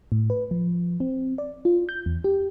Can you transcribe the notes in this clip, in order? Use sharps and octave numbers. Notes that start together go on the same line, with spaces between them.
A2
B4
F3
C4
D5
F4
G6
E2
G4